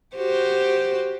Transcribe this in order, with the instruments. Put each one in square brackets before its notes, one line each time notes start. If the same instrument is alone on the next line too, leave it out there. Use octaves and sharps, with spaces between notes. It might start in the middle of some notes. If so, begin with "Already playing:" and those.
[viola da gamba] F#4 G4 C5